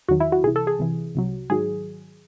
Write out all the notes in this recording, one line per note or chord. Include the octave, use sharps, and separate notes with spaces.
E2 D#3 F#3 F#4
E4
F#4
C2 C3 E3 G#4
A4
G#4
C2 C3 E3
C2 C3 F#3
G#2 D#3 F#3 G#4